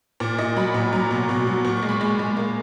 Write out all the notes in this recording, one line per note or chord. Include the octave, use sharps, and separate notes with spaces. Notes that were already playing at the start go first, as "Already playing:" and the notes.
A#2
A#2 D#5
F#3 B5
A#2
F#3 A#5
B2
B2
F#3
A#2 C#6
C#6
G#3
B5
G#3
G#3
A#3